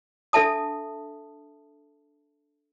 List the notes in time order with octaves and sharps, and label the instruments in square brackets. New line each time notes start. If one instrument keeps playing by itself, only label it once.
[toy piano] D4 A4 E5 A5 D#6